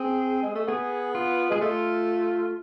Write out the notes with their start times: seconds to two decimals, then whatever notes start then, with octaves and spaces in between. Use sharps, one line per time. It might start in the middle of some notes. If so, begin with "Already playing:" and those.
Already playing: C4 G#4
0.43 G#3
0.55 A3
0.68 B3 G#4
1.15 F4
1.51 G#3 G#4
1.61 A3 F4